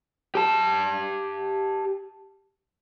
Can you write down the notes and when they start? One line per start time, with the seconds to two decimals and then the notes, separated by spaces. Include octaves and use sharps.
0.35 G4 A5